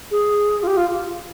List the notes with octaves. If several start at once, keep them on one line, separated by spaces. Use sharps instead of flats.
G#4
F4
G4
F4